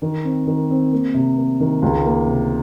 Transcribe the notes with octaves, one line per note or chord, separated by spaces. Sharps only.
D#3
C4
D#3
C4
A#3
C3
A#3
D#3
C#2
A#3
C3